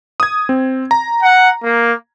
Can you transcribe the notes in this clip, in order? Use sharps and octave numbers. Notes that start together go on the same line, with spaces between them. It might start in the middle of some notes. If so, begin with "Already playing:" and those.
D#6 G#6
C4
A#5
F#5
A#3